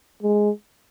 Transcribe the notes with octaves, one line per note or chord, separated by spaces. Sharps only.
G#3